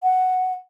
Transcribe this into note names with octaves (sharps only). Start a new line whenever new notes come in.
F#5